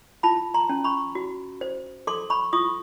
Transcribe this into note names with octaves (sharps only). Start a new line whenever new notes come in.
F4 A5 B5
A#5 C6
C#4
B5 C#6
F#4
C5
A4 C6 D6
B5 C#6
F4 C#6 D#6